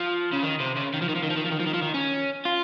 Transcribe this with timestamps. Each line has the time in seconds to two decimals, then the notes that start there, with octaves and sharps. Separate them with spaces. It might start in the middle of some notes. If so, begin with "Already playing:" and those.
Already playing: F3
0.32 C#3
0.43 D#3
0.60 C3
0.76 C#3
0.94 D#3
1.01 F3
1.09 D#3
1.16 F3
1.24 D#3
1.31 F3
1.37 D#3
1.46 F3
1.52 D#3
1.60 F3
1.67 D#3
1.74 F3
1.82 D#3
1.94 C#4
2.45 F4